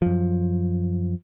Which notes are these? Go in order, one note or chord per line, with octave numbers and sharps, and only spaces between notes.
F#2 F3